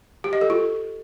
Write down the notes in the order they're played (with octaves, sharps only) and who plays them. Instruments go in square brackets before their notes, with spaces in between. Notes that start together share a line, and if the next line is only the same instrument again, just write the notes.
[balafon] G4
D#5
A4
F4